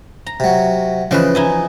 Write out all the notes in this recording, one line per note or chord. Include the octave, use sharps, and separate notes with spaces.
A#5
C3 F#3
C#3 E3 F3 B4 D#5
D#4 E4 G#5